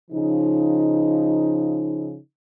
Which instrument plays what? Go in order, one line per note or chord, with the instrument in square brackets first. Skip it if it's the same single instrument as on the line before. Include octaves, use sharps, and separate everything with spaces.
[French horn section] C#3 F3 D#4